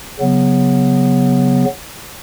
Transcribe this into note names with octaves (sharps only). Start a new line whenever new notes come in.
C#3 F#3 B3